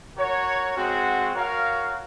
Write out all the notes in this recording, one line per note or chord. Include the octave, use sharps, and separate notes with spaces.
F#4 A#4 C#5
G#3 C4 F#4
F#4 A#4 C#5 F5